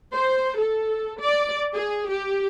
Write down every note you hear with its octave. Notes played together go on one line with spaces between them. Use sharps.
C5
A4
D5
G#4
G4